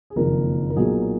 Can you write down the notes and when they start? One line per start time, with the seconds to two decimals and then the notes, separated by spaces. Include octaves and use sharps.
0.10 G#4
0.16 F#1 F2 D#3 A#3 A#4
0.70 A#4
0.76 B1 A#2 F#3 A#3 G#4